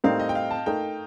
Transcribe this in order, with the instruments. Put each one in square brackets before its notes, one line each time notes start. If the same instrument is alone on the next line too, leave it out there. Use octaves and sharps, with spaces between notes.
[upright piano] A2 G3 C4 D#4 A#4 [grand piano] F5
[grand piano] D#5
G5
F5
A5
[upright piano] A3 D#4 A#4 [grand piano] G5